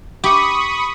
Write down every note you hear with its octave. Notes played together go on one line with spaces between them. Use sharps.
G4 B5 C#6 D#6